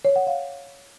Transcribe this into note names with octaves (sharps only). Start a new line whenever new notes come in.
C#5
F#5
F5